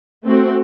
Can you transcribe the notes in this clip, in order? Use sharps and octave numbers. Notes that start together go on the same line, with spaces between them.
A3 C4 F#4